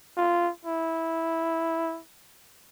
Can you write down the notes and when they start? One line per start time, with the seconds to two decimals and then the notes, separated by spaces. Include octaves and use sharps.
0.17 F4
0.65 E4